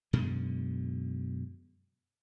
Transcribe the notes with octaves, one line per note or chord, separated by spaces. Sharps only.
F#2 B2 D3 G#3